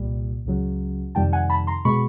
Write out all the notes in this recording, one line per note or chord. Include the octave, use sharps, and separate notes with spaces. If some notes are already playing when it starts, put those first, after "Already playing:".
Already playing: C2 A#2 G3
C#2 C#3 F#3
F2 C3 D#3 G3 G5 A5
F#5 G#5
A5 B5
A#5 C6
B2 G#3 B5 C#6